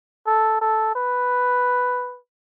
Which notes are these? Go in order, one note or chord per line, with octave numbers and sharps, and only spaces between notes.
A4
A4
B4